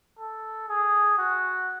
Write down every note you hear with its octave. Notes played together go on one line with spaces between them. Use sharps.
A4
G#4
F#4